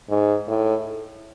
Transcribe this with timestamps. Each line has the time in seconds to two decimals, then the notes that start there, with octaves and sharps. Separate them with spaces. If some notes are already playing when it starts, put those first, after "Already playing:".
0.10 G#2
0.48 A2